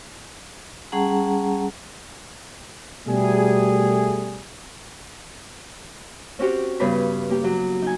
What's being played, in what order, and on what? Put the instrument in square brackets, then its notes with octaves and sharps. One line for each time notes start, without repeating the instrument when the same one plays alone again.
[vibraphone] G3 C#4 G#4 F#5 A5 A#5
[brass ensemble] B2 G3 A3 G#4
[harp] C4 C#4 F#4 G4 C#5
G2 C#3 B3 B5
A#3 G4
F#3
D#4 G#5